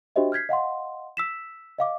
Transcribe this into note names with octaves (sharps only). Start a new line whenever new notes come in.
D4 F#4 G4 C5 D#5 E5
F6 G6 G#6 B6 C7
D#5 F5 F#5 C6
E6 B6 E7
D#5 F5 D6